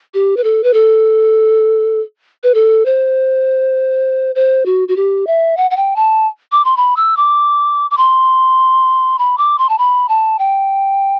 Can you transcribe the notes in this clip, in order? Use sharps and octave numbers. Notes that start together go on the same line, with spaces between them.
G4
B4
A4
B4
A4
B4
A4
C5
C5
F#4
F#4
G4
E5
F#5
F#5
G5
A5
D6
C6
B5
E6
D6
D6
C6
B5
D6
C6
A5
B5
A5
G5